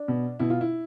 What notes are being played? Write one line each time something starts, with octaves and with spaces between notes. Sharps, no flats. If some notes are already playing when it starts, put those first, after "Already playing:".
Already playing: D4
B2
B2 E4
F4
E4